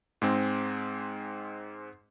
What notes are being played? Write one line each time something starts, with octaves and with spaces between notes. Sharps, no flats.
G#2 G#3 C4